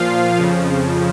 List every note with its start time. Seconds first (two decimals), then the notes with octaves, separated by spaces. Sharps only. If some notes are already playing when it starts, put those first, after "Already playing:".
Already playing: A#2 F3 F4 F5
0.37 F2 C#3 F3